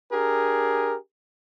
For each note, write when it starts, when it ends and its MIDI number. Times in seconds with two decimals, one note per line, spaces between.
0.12 0.96 62
0.12 0.96 67
0.12 0.96 68
0.12 0.96 70